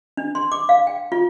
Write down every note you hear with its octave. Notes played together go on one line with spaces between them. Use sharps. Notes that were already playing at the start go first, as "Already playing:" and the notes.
D4
C6
D6
F5
G5
F4